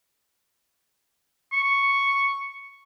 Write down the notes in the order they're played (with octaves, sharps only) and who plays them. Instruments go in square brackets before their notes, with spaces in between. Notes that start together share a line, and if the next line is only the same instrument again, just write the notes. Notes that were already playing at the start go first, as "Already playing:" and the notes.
[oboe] C#6